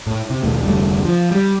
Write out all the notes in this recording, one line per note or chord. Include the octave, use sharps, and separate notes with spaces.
A2
C3
D#2 B2 A3
F1 D2 G3 A3
F3
G3